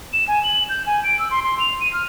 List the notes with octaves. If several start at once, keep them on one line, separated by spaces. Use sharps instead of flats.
E7
G#5
F#7
G6
G#5
D7
E6
C6
C6
F7
D#7
F6